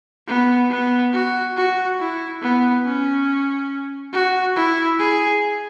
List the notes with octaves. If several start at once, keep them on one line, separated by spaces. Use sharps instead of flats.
B3
B3
F#4
F#4
E4
B3
C#4
F#4
E4
G#4